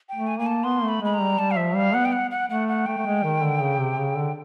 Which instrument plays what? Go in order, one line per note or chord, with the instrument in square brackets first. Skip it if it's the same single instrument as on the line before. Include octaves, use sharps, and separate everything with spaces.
[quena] G5
[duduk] A3
[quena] G#5
[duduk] A#3 [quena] G#5
[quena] A5
[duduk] B3 [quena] C6
[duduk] A3
[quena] B5
[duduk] G#3 [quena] B5
[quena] A#5
[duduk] G3
[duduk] G3 [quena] A5
[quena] F5
[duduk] F3 [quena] E5
[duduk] G3 [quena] F5
[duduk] B3 [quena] F#5
[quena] G5
F#5
F#5
[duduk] A3 [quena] F#5
[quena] F#5
[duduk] A3 [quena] G5
[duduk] A3
G#3
D#3
D3
C#3
C3
C#3
D3